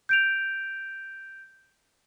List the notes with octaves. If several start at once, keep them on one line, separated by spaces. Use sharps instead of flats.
G6 D7 F7